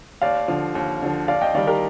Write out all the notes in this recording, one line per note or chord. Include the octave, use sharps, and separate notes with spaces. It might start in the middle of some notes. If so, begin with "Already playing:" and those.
D#2 D5 F5
D3 F3
D#2
D3 F3
D#2 D5 F5
D#5 G5
D#3 G3 D5 F5
G4 A#4